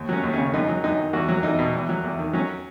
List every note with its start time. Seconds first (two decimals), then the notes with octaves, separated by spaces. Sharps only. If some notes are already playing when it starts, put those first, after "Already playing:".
Already playing: D#2
0.09 F#3 C#4
0.24 D#2
0.34 C#3 C#4
0.53 F#2 D#4
0.69 F#3
0.84 F#2 D#4
0.99 D#3
1.13 E2 F#4
1.28 F#3
1.43 E2 D#4
1.59 B2
1.74 E2
1.89 F#3
2.04 E2
2.19 D#3
2.33 F#3 C#4